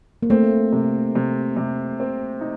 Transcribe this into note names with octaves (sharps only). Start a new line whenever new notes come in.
A#3
A3 C4
C3
C3
C3
C4
D#4